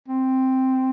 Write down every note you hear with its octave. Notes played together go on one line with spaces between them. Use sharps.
C4